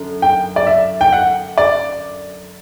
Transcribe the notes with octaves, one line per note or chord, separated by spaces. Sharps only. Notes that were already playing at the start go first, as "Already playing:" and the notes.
Already playing: F#2 D3
G5
D5
E5
G5
F#5
D5